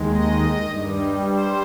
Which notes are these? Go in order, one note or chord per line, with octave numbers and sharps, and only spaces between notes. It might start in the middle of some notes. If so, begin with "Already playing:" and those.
Already playing: D#2 D#3 G#3
D#5
G2 G3
C5